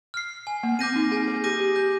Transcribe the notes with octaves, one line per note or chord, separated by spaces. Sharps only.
F6 C7
G#5
A#3
C4 D6 G6 A#6 D#7
D#4
G#4 G#5
G#4
G4 D6 G6 A#6 D#7
G4
G4 G6